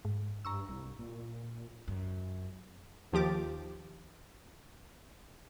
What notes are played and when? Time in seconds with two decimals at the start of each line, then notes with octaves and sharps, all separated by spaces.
0.05 G#2
0.45 G2 A#5 C#6 E6
0.69 C2
0.99 A#2
1.88 F#2
3.13 D#2 F3 G4 D6 A6